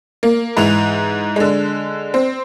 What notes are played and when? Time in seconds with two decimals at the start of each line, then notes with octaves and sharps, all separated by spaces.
0.23 A#3
0.57 G#2 E3 F7
1.36 D3 G#3
2.14 C4